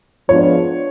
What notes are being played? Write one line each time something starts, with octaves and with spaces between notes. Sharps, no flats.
F3 G#3 B3 D4 F4 C#5